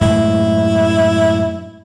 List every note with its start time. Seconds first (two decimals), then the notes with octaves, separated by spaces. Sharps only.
0.01 F#2 A2 G#3 E4